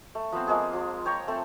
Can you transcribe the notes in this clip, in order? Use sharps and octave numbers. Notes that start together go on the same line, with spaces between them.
A3
F3 B3 C4
F3 G#3 A#3 G#4
F3
C#5 G5 A#5 C#6
A3 C4 A4